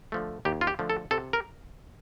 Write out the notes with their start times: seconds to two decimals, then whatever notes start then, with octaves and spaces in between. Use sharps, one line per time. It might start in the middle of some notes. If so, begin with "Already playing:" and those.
0.12 D3 F3 A3
0.45 D#2 G4
0.61 F4
0.67 G4
0.79 D3 F3 A3
0.90 A4
1.11 C3 A4
1.33 A#4